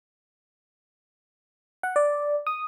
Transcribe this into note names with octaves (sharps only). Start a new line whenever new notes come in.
F#5
D5
D#6